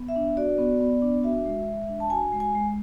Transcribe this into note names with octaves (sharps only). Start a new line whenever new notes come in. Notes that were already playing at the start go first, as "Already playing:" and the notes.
Already playing: B3
E5
D4
F#4 D5
B3
B3
D4
F#4 E5
G#3
G#3
D4
A5
F#4 G#5
G#3
G#5
G#3